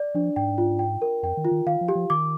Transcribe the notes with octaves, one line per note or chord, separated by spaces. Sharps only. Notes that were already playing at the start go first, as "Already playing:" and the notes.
Already playing: D5
F3 D4
G#2 G5
F4
G5
A#4
F2 G5
D#3
F4
D#3
D#3 F5
F3
G4
F3
D#3 D6